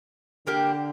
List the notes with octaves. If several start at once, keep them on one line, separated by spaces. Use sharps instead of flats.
D3 G3 A#3 D4 G4